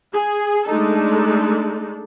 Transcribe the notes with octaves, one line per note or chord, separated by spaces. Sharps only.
G#4
G#3 A3 D4 D#4 A4